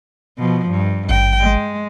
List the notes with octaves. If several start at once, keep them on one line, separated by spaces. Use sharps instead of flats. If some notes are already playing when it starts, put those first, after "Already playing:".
B2 F3
G2
G#1 G5
G#3